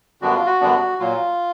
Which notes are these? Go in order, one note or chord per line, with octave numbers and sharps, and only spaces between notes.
F#2 D3 G3 B3 D4 F#4
F4
F#4
F#2 D3 G3 B3 D4
A#2 F#3 A#3 F4